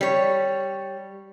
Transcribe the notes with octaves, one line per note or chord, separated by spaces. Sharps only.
G3 C#5